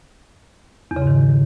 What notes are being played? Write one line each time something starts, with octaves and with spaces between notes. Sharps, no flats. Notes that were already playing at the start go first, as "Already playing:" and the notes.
E2
C#3
G#2
D#3